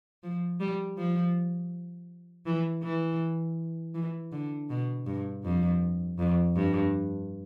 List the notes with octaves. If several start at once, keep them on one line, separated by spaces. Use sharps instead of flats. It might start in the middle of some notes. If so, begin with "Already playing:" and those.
F3
G3
F3
E3
E3
E3
D3
B2
G2
F2
F2
G2